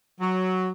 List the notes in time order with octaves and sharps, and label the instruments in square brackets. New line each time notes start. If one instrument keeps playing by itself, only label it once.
[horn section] F#3